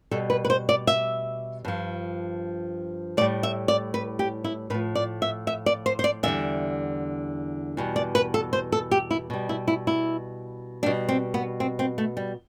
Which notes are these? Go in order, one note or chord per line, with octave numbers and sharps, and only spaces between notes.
B2 G3 A4
B4
B4
C5
D5
E5
G2 F3
A2 G3 D5
E5
D5
B4
G4
E4
A2 F3 B4
D5
E5
E5
D5
C5
C5
D5
E2 D3 G3 E5
E2 B2 G3
D5
B4
A4
C5
A4
G4
E4
B2 G3
E4
E4
E4
B2 G3 D4
C4
B3
C4
C4
A3
G3